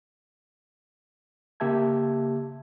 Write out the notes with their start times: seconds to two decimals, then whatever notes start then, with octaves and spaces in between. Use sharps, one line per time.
1.60 C#3 A#3 G4 E5 A5 G#6